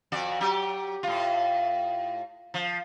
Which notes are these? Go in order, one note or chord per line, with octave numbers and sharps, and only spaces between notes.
F2 F#4 D5
F#3 G4
A2 F4
F3